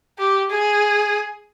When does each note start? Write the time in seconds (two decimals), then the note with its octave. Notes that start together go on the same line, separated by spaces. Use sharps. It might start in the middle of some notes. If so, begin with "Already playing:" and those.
0.19 G4
0.50 G#4